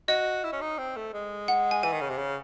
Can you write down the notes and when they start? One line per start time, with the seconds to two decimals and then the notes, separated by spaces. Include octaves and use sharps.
0.08 F#4 D#5
0.44 E4
0.52 C#4
0.61 D#4
0.78 C4
0.96 A3
1.14 G#3
1.48 F#5
1.71 G#5
1.83 E3 G#5
1.92 D#3
2.01 C#3
2.10 C3
2.18 C#3